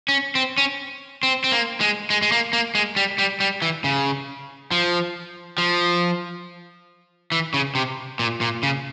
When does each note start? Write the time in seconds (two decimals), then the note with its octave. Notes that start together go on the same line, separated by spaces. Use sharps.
0.08 C#4
0.35 C4
0.58 C#4
1.23 C4
1.44 C4
1.52 A#3
1.80 G#3
2.10 G#3
2.22 G#3
2.32 A#3
2.53 A#3
2.75 G#3
2.96 G3
3.18 G3
3.40 G3
3.62 E3
3.84 C#3
4.71 F3
5.58 F3
7.32 E3
7.54 C#3
7.75 C3
8.19 A#2
8.41 A#2
8.63 C#3